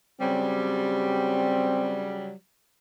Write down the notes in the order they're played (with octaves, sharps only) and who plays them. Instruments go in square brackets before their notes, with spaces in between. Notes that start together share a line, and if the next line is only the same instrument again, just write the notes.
[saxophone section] C#3 F#3 G3 [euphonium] C4